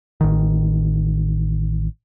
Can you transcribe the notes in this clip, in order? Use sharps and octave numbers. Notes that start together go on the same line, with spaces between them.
A1 D#3